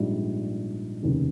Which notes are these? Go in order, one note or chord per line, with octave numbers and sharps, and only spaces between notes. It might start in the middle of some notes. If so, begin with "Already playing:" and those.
Already playing: A#1 G#2 G3
F1 D#2 C#3